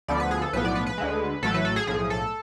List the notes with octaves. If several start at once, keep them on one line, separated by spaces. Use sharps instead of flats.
D2 D3 F3 B3 D5
B4
G#4
A4
B1 A2 F3 B3 B4
D5
B4
B4
D2 D3 G#3
A1 A2 F#3 A3 A4
B4
A4
G#4
B1 A2 F3 G#4
A4